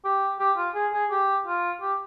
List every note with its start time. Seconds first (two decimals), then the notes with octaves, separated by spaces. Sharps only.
0.05 G4
0.39 G4
0.57 F4
0.75 G#4
0.93 G#4
1.11 G4
1.47 F4
1.82 G4